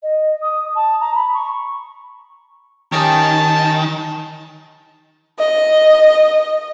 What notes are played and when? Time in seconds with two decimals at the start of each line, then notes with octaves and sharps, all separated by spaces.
0.03 D#5
0.42 D#6
0.75 A5
1.01 A#5
1.15 B5
1.34 C#6
2.92 D#3 C#4 D#4 G4 A5
5.39 D#5